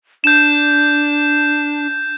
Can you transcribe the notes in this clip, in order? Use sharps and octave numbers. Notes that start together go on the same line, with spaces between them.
D4 G6 E7